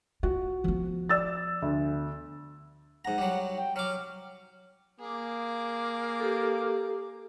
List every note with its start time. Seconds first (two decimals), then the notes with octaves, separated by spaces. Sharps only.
0.23 F4 F#4
0.64 F3 B3
1.09 D5 E6 A6
1.62 D2
3.05 G#2 F#5 A#5
3.18 F#3 G3
3.57 G5
3.76 F#3 D6 F6
5.00 A#3 G#4 D6
6.20 G4 A4